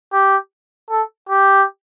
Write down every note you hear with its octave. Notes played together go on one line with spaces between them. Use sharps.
G4
A4
G4